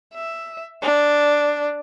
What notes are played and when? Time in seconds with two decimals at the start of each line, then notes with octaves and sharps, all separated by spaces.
0.14 E5
0.82 D4